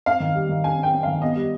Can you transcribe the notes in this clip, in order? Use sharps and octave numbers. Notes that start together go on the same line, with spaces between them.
C4 F5
D#3
G3
D#3
C4 G#5
C4 G5
C4
F5
D#3
B3 D#5
G3